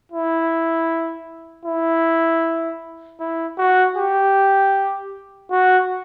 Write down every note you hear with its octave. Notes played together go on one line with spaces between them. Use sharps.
E4
E4
E4
F#4
G4
F#4